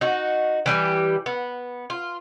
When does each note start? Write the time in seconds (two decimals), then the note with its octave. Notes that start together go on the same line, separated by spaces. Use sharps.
0.01 D#4 F#4
0.66 E3 G3 G4
1.26 B3
1.90 F4